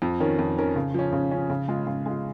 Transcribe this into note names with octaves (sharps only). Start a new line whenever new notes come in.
F2
D#3 C#4 A#4
F2
D#3 C#4 A#4
C#3
F3 C#4
C#3
F3 C#4
C#3
G#3 F4
C#3
G#3 F4